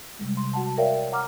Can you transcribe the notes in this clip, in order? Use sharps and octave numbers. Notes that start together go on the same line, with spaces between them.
C3 G3 G#3
C6
F#4 F#5 A5
A#4 C#5 D5 E5 F5 G5
F#5 A#5 D6 F6